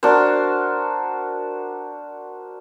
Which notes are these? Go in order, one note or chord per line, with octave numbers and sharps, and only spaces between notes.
D4 F#4 A#4 C5